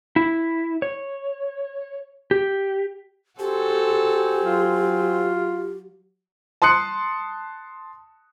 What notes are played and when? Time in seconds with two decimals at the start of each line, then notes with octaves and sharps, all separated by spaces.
0.16 E4
0.82 C#5
2.31 G4
3.39 C4 F#4 G4 A4 C5 G#5
4.45 F#3 F4
6.62 A5 C6 D#6 F#6 C#7